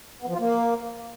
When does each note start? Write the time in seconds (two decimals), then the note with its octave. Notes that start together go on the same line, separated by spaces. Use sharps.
0.22 B3
0.28 F3
0.34 F4
0.40 A#3